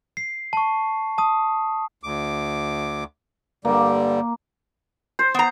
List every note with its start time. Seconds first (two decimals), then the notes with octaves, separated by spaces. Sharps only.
0.17 C7
0.53 A5 C#6
1.18 A5 D#6
2.03 D2 D6
3.65 G2 D3 G3 A#3
5.19 C5
5.34 B3 A#5